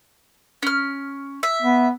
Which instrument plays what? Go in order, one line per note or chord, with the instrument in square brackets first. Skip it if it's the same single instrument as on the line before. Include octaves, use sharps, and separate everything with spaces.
[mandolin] C#4 F6
E5
[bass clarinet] B3